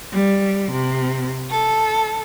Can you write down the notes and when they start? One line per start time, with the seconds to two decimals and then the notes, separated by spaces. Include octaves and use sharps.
0.12 G3
0.73 C3
1.49 A4